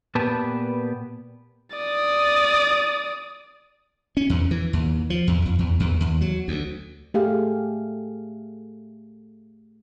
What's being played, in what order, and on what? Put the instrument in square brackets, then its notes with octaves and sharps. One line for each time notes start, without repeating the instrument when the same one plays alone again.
[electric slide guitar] A#2 B3 G4 B4 A5
[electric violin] D5 D#6
[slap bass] C#4
E2
E3
D#2
F3
E2
F2
E2
E2
D#2
F#3
D2
[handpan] A3 G4 G#4 F5